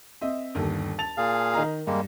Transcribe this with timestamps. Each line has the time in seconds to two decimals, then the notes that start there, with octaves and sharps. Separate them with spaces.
0.21 C4 D#5 E5
0.55 G1 D#2 A4
0.99 A5 A6 F7
1.17 A#2 G#4 F5
1.54 D#3 D#5 A#5
1.87 G2 G3 G#3 A#3